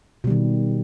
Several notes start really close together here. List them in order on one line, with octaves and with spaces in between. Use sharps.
B2 G3 D#3